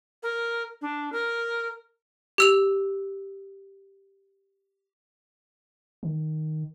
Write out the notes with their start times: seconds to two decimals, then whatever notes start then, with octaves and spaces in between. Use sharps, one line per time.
0.23 A#4
0.82 D4
1.13 A#4
2.38 G4 E6 F7
6.03 D#3